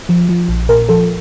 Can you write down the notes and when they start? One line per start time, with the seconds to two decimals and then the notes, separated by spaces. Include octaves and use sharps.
0.09 F3
0.29 F3
0.49 A#1
0.69 A#2 A#4
0.89 F3 A4